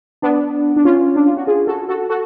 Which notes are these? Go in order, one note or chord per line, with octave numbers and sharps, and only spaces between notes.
B3 D4
D4
C#4 F4
D4
F4
F#4
F4 G#4
F#4 A4
F#4 A4
F#4 A4